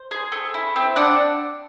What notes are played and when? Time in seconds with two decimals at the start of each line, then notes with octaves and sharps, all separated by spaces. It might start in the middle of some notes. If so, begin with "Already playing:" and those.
Already playing: C5
0.11 G#4
0.32 A3
0.54 E4
0.76 C4
0.96 D4 F#5